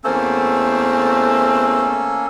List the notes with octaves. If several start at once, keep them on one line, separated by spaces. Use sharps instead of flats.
E2 A3 A#3 C4 C#4 A4